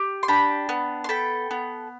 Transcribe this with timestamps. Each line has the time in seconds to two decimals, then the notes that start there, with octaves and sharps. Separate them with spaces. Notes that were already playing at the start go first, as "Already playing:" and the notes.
Already playing: G4
0.23 C6
0.28 D4 G5 B5
0.69 B3
1.04 C6
1.09 A4 G5 B5
1.51 B3